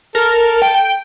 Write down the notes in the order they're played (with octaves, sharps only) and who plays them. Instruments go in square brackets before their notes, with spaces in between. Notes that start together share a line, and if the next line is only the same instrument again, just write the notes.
[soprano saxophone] A4 [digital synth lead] A#4
[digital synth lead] G5
G5